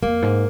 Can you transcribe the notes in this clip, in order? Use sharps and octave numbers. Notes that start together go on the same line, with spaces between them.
F2 A#3
G#2